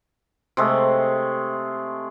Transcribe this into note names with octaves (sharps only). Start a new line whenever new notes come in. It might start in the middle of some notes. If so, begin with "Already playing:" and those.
C3 G#3 A3